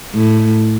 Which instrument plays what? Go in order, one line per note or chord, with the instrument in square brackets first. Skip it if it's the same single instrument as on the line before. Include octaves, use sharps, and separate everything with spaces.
[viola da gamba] A2